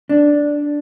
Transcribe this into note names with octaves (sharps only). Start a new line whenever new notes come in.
D4